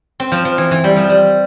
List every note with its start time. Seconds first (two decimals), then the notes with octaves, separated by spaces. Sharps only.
0.20 C4
0.32 F3
0.45 F3
0.58 E3
0.71 E3
0.84 G3
0.96 F3
1.09 G3